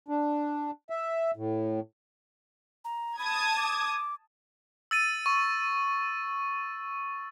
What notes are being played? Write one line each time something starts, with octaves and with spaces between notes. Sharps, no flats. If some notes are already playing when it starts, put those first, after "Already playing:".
D4
E5
A2
A#5
A5 B5 D#6 G#6
D6
E6 A6 D#7
C#6